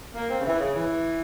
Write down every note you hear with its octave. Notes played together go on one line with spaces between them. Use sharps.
A#3
C4
C#3
E3
C#3
E3